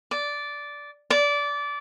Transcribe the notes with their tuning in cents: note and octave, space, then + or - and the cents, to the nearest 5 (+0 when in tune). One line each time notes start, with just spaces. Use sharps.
D5 -10
D5 -20